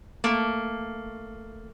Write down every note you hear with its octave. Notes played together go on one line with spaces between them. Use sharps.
A3 A#3